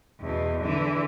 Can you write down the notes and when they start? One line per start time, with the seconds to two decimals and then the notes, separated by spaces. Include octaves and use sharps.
0.21 E2 B2
0.60 D3 E3